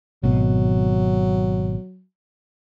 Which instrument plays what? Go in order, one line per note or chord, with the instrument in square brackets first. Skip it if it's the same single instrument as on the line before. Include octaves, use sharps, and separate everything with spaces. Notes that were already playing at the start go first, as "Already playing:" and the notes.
[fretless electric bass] G#1 B2 [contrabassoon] F#3